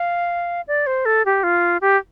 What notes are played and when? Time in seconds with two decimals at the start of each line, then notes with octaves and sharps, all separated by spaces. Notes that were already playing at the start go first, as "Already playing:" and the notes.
Already playing: F5
0.68 D5
0.87 C5
1.05 A4
1.26 G4
1.43 F4
1.81 G4